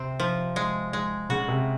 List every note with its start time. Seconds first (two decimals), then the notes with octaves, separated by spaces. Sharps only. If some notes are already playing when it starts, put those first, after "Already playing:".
Already playing: C3 C4
0.20 F3
0.56 G#3
0.93 G#3
1.29 C#3 F#4
1.48 C3